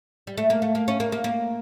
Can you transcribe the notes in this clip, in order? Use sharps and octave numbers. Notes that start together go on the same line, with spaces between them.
G3
A3
A#3
A3
A#3
C#4
A#3
A#3
A#3